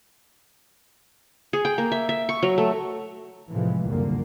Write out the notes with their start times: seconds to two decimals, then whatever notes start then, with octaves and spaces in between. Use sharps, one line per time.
1.53 G#4
1.65 G5
1.78 A#3
1.92 E5
2.09 E5
2.29 C#6
2.43 F#3
2.58 A3
3.51 A2 C3 E3 F3 G#3
3.87 F#1 C2 A#2 D3 A#3